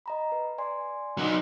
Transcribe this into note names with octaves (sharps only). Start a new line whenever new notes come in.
D#5 A#5 B5
B4
D5 G#5 C6
F#3 D#4